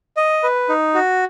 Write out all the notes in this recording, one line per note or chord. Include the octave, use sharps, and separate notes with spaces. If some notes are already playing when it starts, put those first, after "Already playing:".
D#5
B4
D#4
F#4